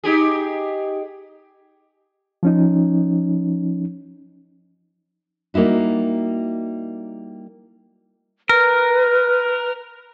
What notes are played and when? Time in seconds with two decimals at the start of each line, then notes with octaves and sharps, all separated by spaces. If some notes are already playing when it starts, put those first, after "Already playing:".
0.04 D#4 G4 G#4
2.43 F3 C#4 D#4
5.54 G3 A#3 D#4 E4 F#4
8.49 A#4 B4